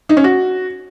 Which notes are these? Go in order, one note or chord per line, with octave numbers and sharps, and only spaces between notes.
D#4
C#4
F#4